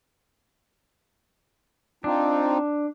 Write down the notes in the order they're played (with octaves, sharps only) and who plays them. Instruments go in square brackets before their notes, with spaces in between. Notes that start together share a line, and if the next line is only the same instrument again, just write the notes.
[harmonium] C4 D#4 F4 [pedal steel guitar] D4